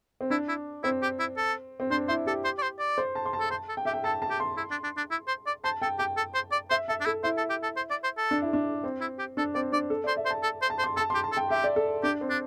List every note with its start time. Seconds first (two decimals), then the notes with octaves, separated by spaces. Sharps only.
0.21 C4
0.30 D4 E4
0.49 E4
0.84 C4 E4
1.03 G4
1.20 E4
1.37 A4
1.80 C4
1.90 D4 C5
2.08 E4 C5
2.26 G4 A4
2.44 C5
2.58 D5
2.62 C5
2.79 D5
2.98 C5
3.15 A5
3.26 C6
3.33 A5
3.40 A4
3.50 C5 A5
3.69 A4
3.77 G5
3.85 G4 E5
3.94 G5
4.04 A4 A5
4.22 A5
4.30 G4
4.40 C6
4.57 E4
4.71 D4
4.84 D4
4.97 D4
5.11 E4
5.28 C5
5.47 D5
5.64 C5 A5
5.82 A4 G5
5.99 G4 G5
6.17 A4
6.34 C5
6.52 D5
6.70 C5 E5
6.88 A4 E5
7.00 D4
7.06 E4 A4
7.23 E4 C5
7.37 A4
7.50 G4
7.63 A4
7.76 C5
7.90 D5
8.04 C5
8.18 A4
8.31 D4
8.42 E4
8.53 D4
8.84 C4
9.01 E4
9.19 G4
9.37 D4 A4
9.55 C4 D5
9.73 D4 D5
9.90 A4
10.04 C5 D5
10.17 E5
10.26 C5
10.30 A5
10.43 A4
10.62 C5
10.70 A5
10.79 C5
10.84 C6
10.97 A4 A5
11.10 G4 C6
11.24 A5
11.32 A4
11.37 G5
11.50 G4 E5
11.64 D5
11.76 A4
12.03 D4 G4
12.21 C4
12.29 D4